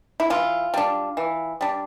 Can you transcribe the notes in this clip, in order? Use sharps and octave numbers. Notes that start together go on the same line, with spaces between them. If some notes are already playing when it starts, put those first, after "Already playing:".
E4
E3 F4
G3 D4
E3
G3 D4